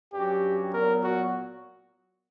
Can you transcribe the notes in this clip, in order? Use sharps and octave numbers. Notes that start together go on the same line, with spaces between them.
G2 F#3 C#4 F#4 G4
A#2 F#3 B3 A#4
F#4